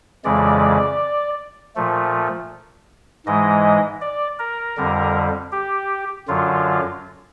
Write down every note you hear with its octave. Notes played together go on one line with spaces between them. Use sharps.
F2 C#3 E3 G#3 D5
A#2 F3 A3
G#2 E3 G#3 D#5
D5
A#4
F2 D3 G3
G4
F#2 D3 F#3 F4